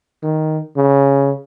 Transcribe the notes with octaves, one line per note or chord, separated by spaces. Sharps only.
D#3
C#3